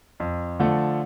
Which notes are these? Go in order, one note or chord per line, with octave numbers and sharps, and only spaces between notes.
F2
D3 F3 A3